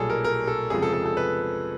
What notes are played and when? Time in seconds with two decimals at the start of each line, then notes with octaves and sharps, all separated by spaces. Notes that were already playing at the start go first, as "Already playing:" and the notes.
Already playing: B1 A#2 G3 G#4 A4
0.10 A#4
0.24 A#4
0.47 A4
0.70 F1 F2 C#3 F3 G#3 G#4
0.82 A4
0.93 A4
1.05 A4
1.17 B4